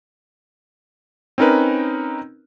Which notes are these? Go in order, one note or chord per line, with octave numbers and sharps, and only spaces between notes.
C4 C#4 D#4 A#4 B4